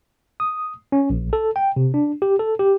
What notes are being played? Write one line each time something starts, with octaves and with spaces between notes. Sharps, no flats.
D#6
C#4
A#1
A4
G5
C3
D4
G4
A4
G4